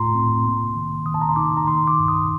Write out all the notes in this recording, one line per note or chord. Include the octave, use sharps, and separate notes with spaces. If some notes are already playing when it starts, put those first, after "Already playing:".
Already playing: A2 A3 F4 A#5 C6
C4
A#3
D#3
D#3 D#6
A5
A#5
C6
D#4 D6
A#5
D#3 C6
D6
G2
D#6